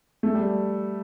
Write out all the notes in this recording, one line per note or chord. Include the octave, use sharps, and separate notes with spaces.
A3
G3